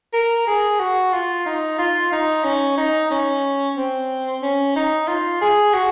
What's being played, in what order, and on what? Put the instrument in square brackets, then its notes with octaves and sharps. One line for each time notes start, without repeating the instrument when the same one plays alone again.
[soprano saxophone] A#4
G#4
F#4
F4
D#4
F4
D#4
C#4
D#4
C#4
C4
C#4
D#4
F4
G#4
F#4